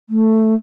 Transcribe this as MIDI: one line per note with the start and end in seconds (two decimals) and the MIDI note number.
0.09 0.54 57